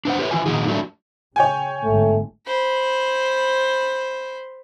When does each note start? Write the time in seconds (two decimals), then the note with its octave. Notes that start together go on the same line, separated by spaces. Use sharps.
0.05 D4 B4 C5 F#5
0.19 G4 B4 C#5
0.31 E3 F4 G#5
0.46 A#2 D#3 C4 D#4 F#4 G#4
0.68 F#3 G3 A3 D4
1.36 C#3 C#5 G5 G#5
1.84 G1 G#2 A3
2.47 C5 B5